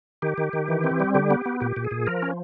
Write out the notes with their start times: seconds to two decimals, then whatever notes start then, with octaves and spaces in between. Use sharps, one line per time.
0.22 D#3 G4
0.38 D#3
0.53 D#3
0.68 E3
0.84 C4
1.00 G3
1.14 D3 G4
1.31 B3
1.46 B3
1.60 A#2 G4
1.76 A#2
1.84 G#4
1.91 A#2
2.07 F3 A#4
2.22 C#4